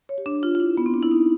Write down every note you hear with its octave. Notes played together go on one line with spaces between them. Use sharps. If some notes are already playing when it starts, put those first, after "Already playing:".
C#5
G4
D4
F4
F4
E4
B3
C4
D4
E4
D#4